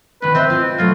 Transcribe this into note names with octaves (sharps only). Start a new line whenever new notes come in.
B2 D#3 B4
C4 C5 D#5 E5
F4
B2 F#3 A3 F4